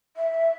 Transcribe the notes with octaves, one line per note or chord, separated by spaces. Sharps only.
E5